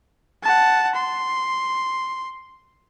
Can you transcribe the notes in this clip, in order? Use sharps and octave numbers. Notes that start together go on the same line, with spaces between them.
F#5 A5
C6